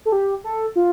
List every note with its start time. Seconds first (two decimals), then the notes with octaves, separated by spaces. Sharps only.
0.06 A4
0.12 G4
0.44 A4
0.76 F4